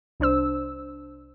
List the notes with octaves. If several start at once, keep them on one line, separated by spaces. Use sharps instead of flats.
C2 D4 C5 E6